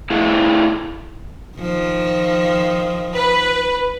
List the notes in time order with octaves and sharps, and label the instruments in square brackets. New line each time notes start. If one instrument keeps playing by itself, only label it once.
[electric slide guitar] A3 E4 G#4 F5
[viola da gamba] D#3 F3
[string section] B4